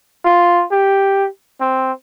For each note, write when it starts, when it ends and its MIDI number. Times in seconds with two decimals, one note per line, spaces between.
0.25 0.64 65
0.71 1.28 67
1.61 1.92 60